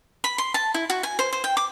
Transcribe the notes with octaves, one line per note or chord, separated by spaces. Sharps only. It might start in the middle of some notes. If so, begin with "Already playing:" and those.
B5
C6
A5
E4
F#4
G#5
C5
C5
G5
D6